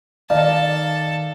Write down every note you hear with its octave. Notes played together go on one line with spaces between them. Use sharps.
D#3 A4 D5 F5 A5